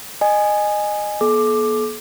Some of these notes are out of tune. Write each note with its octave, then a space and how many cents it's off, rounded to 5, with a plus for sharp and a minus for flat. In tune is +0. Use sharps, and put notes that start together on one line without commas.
D#5 -20 G#5 +0
B3 -45 A4 -45 D6 +10